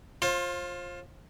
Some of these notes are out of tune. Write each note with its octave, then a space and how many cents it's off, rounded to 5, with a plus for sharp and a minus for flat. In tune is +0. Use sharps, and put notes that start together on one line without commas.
F4 +10 C5 +35